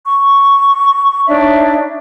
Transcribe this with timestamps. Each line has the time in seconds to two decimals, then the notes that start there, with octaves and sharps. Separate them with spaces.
0.07 C#6
1.27 D4 D#4 C#5 E5